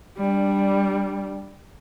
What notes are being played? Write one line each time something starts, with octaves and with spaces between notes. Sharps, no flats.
G3 D4